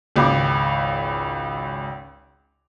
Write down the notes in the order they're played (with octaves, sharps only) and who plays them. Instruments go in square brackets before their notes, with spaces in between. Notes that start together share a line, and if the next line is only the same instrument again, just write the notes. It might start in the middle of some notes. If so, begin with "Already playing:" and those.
[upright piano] G#1 C#2 D6